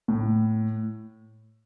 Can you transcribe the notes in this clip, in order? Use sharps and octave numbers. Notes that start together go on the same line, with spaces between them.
A2